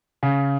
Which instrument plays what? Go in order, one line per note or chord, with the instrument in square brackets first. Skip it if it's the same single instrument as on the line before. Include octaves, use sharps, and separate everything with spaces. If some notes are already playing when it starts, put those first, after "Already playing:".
[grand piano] C#3